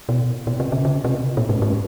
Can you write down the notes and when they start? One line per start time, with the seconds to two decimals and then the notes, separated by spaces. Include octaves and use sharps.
0.09 B2
0.47 B2
0.60 C3
0.72 C#3
0.85 C#3
1.04 C3
1.37 A#2
1.49 G#2
1.62 G#2